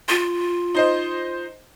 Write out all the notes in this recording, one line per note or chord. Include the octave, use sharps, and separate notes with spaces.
F4
D#4 C5 D#5